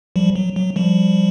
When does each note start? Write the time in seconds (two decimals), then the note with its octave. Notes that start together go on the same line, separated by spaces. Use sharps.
0.16 F3 G3
0.36 F#3
0.56 F#3
0.76 F3 G3